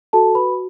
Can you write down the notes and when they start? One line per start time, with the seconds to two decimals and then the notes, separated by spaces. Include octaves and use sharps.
0.13 F#4 A4 A5
0.35 B4 B5